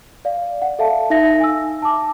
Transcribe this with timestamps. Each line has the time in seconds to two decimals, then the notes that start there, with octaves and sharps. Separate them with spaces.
0.25 D5 F5
0.62 F#5
0.79 A4 E5 F5 A5
1.10 D#4 E5 A#6
1.40 G#5 E6
1.82 A5 D6